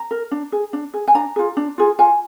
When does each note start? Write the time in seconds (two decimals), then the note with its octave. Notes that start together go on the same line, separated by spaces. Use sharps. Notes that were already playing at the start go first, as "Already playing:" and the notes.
Already playing: A#5
0.11 A#4
0.31 D4
0.52 G#4
0.73 D4
0.94 G#4
1.08 G#5
1.15 D4 A#5
1.36 F4 G#4
1.57 D4
1.78 F4 G#4
1.99 F4 G#5